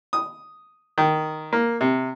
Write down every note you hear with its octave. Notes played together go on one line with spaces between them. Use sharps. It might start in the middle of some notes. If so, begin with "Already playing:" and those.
D#6
D#3
A#3
C3